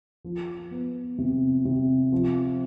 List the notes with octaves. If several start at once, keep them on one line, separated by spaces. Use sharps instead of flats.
F3
B3
C3
C3
F3